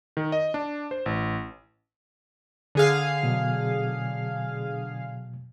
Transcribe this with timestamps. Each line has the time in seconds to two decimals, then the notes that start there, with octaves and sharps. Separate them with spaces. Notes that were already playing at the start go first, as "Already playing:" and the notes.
0.17 D#3
0.32 D#5
0.54 D4
0.91 C5
1.06 A1
2.75 D3 G#4 F5
3.23 B2 F#3